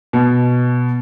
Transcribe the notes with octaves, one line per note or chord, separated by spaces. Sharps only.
B2